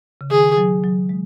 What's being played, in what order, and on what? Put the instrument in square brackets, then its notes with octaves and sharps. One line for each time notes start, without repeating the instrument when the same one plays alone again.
[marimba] C#3
[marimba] D#3 [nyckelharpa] G#4
[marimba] F#3
F#3
G#3